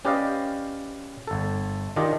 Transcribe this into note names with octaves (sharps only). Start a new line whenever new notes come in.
C#4 G4 B4 D5 D#5 F5
G1 A4
D#3 D4 F4 G4 D#5